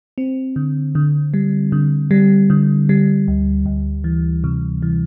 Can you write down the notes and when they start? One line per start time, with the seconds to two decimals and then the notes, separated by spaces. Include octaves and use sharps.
0.18 C4
0.56 D3
0.95 D3
1.34 G3
1.72 D3
2.11 G3
2.50 D3
2.89 G3
3.28 D2
3.66 D2
4.04 E3
4.44 C3
4.82 E3